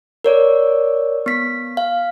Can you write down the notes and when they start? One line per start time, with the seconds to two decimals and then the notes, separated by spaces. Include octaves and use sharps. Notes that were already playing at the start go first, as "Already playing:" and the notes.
0.24 A#4 C#5 D5
1.26 B3 B6
1.77 F5